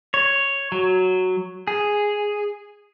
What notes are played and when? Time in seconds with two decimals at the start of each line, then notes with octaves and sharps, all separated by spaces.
0.14 C#5
0.72 F#3
1.67 G#4